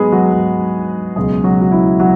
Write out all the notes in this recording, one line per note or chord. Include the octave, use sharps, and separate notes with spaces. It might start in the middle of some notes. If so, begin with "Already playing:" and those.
Already playing: G#2 F#3 G#3 B3 D#4 G#4 B4
F#3 F#4
G#2 F#3
C#2 B2 F#3 G#3 G#4
F#3 F#4
F#4
E4
F#3 F#4